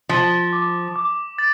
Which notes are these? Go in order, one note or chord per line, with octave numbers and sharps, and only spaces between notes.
F3 D7
D6
D6
A6